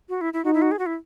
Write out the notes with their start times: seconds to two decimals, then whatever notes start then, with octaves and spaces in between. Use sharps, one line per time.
0.09 F#4
0.21 E4
0.33 E4
0.45 D#4 F#4
0.54 E4
0.62 F#4
0.71 G#4
0.79 F#4
0.86 E4